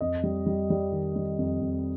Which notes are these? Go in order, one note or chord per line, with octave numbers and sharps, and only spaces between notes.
F2 D#5
G3
G3
G3
D#3
G3
F2
F2